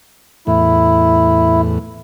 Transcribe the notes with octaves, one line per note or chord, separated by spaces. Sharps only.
E2 A2 E4